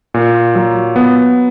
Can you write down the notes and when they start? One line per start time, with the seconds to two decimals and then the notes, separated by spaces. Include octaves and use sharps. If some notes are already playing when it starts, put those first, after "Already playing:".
0.14 A#2
0.55 F#3
0.96 B3